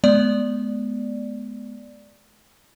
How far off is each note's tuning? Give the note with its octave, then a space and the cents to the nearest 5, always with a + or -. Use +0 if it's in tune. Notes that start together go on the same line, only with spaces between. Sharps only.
G#3 +35 B3 +0 D5 +0